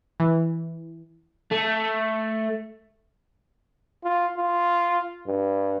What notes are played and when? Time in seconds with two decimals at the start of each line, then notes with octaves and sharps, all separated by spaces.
0.20 E3
1.51 A3
4.04 F4
4.38 F4
5.27 G2